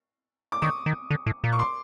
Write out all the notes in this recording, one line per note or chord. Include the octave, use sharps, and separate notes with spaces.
D6
D#3 C#6 D#6
D#3
D3
A2
A#2
C#6
C6 D6